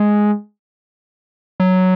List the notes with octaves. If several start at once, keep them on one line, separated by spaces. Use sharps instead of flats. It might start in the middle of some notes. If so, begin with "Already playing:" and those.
Already playing: G#3
F#3